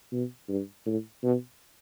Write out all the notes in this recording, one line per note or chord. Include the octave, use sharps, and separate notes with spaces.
B2
G2
A2
B2